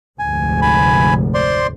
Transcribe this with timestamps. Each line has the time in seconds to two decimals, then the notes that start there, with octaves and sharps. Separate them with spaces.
0.19 F1 D2 G#2 G#5
0.62 G#5 B5
1.34 C5 D5 C6